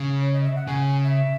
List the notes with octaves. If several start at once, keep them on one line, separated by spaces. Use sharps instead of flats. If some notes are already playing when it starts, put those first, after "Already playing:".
Already playing: C#3
C#5
D#5
E5
F#5
C#3 G#5
E5